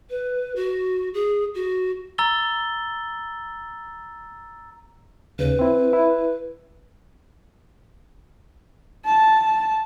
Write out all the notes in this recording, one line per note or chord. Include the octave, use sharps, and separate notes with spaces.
B4
F#4
G#4
F#4
A#5 E6 A6 G7
D#2 C#3 B4
C4 E4
E4
A5